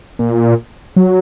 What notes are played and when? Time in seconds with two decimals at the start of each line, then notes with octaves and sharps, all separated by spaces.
0.19 A#2
0.96 F#3